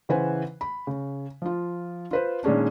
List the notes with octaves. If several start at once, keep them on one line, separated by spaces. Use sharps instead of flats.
C#3 E3 B4 C5 F#5 G#5
B5
C#3
F3 F4
F4 B4 C5
A#2 D#3 G#3 C#4 D4